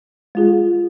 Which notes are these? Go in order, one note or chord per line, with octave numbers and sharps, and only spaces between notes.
G#3 F4 G#4